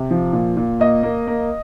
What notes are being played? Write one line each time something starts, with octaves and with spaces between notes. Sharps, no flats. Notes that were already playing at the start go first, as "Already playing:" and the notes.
Already playing: C3
F3
A#2
A#2
A#3 D#5
A#3
A#3